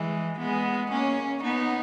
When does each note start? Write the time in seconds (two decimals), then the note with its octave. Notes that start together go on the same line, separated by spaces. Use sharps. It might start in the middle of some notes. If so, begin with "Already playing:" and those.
Already playing: E3 G#3
0.39 G#3 B3
0.91 A#3 C#4
1.43 B3 D#4